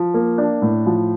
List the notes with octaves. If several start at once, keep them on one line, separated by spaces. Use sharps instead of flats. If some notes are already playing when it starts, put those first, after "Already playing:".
Already playing: F3
A#3
D4
A2
F3